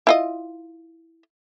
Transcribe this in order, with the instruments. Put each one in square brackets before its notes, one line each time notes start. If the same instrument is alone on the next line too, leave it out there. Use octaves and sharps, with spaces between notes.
[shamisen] E4 F4 D#5